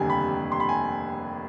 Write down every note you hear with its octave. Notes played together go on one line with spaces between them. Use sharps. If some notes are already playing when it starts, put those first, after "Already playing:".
Already playing: F1 D#2 D3 G3 G#5
B5
C6
B5
G#5